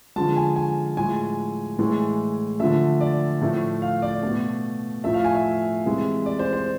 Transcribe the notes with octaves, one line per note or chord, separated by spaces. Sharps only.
D3 F3 G#3 A5
G#5
G#5
A2 F3 G#3 G#5
A2 E3 G#3
D3 F3 A3 E5
D5
A2 F3 A3
F5
D5
B2 A3
A2 F3 A3 E5
F5
G#5
E5
C3 E3 G#3
D5
C5
C5